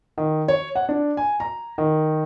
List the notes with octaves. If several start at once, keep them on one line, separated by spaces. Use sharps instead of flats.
D#3
C#5
F#5
D4
G#5
A#5
D#3